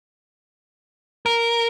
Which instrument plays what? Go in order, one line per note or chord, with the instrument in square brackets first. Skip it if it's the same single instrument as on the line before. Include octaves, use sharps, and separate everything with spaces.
[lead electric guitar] A#4